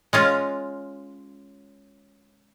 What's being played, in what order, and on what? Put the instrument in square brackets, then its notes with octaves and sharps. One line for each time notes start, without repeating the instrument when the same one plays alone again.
[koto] G#3 C#4 F4